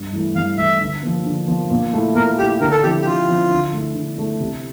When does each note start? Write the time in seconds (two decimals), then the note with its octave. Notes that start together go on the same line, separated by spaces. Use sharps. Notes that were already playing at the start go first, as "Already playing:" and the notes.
Already playing: G2
0.13 E3 A3 E4
0.35 G2 F5
0.58 E3 A3 E4 E5
0.80 D3
1.03 F3 A#3
1.26 D3
1.48 F3 A#3
1.70 A#2
1.93 A3 E4
2.15 A#2 A#4
2.38 A3 E4 G4
2.60 D3 A#4
2.71 A4
2.83 F3 C4 E4 G4
3.01 G4
3.06 D3 F4
3.28 F3 C4 E4
3.50 D3
3.73 A3 E4
3.95 D3
4.18 A3 E4
4.40 C3